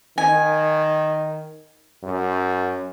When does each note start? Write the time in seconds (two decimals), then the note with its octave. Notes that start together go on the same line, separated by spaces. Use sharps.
0.18 D#3 G#5
2.04 F#2